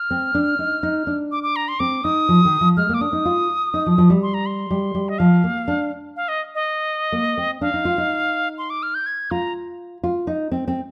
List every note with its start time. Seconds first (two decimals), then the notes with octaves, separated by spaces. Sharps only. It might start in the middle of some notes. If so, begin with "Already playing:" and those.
Already playing: F6
0.11 C4
0.35 D4
0.59 D#4
0.83 D#4
1.07 D4
1.32 D6
1.43 D6
1.56 A#5
1.68 C6
1.80 C4 D6
2.04 D#4 D#6
2.29 F3
2.45 D#3
2.61 F3
2.77 G#3 F6
2.89 A#3 D6
3.01 D4 D#6
3.13 D#4
3.25 F4
3.74 D#4
3.86 F3
3.98 F3
4.10 G3
4.22 C6
4.34 A#5
4.46 C6
4.71 G3
4.95 G3
5.09 D#5
5.18 F3 F5
5.44 A#3
5.68 D4
6.16 F5
6.28 D#5
6.55 D#5
7.12 A#3
7.38 C4
7.61 D4 F5
7.74 D#4
7.85 F4
7.98 D#4
8.58 C6
8.70 D6
8.83 F6
8.95 G6
9.06 G#6
9.31 F4 A#5
10.04 F4
10.27 D#4
10.51 C4
10.68 C4